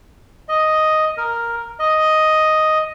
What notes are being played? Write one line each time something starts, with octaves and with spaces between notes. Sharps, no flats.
D#5
A#4
D#5